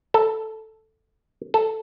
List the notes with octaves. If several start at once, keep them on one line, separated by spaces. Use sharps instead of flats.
A4
A4